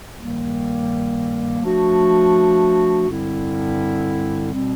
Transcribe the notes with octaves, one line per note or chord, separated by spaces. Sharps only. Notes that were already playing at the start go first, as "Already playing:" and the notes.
G2 D#3 G3 A#3
F3 A3 D4 F#4
G2 D3 G3 C4 E4
B2 G3 C4